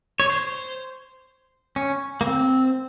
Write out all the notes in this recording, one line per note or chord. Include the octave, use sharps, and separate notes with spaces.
C#5
C5
C#4
A#3
C4